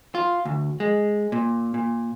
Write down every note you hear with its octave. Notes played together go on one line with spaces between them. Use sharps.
F4
D2
G#3
A#2
A#2